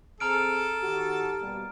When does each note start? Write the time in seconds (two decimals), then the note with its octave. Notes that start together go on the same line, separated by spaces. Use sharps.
0.20 C4 G#4 A4 A#5 F6 D7
0.82 D#3 F#4 G4
1.40 B2 G3 A#3